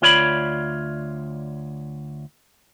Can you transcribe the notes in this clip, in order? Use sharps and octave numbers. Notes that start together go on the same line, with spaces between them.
D2 F4 C#5 D5 A5 B5